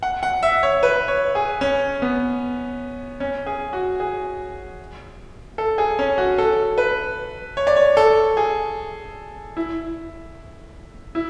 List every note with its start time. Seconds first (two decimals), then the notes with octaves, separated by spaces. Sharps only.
0.03 F#5
0.23 F#5
0.43 E5
0.63 C#5
0.83 B4
1.08 C#5
1.35 G#4
1.61 C#4
2.02 B3
3.20 C#4
3.46 G#4
3.73 F#4
4.00 G#4
5.58 A4
5.78 G#4
5.99 C#4
6.18 F#4
6.38 A4
6.78 B4
7.57 C#5
7.67 D5
7.76 C#5
7.97 A4
8.37 G#4
9.57 E4
11.15 E4